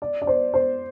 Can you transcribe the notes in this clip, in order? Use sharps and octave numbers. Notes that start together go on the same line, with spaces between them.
D5
D5
C5
C5